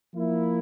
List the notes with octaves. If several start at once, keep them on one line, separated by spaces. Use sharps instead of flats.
F3 A#3 E4